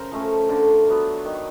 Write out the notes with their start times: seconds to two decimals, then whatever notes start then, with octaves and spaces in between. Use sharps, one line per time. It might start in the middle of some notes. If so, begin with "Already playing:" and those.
Already playing: C#3 A#4 C5
0.12 F3 A3 C#4
0.49 D3
0.88 F#3 B3
1.25 D#3